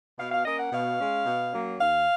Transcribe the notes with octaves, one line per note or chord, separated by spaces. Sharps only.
B2 F5
F5
A#3 C#4 D#5
F#5
B2 F5
G#3 C#4
B2
F#3 A#3 C#4
D#2 F5